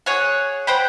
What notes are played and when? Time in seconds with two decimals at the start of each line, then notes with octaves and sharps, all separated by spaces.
0.06 G#4 C#5 F#5
0.67 C5 F#5 G5 B5